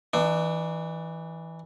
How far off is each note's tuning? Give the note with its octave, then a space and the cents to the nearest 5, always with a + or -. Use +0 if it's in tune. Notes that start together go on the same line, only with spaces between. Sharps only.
E3 -10 D4 +35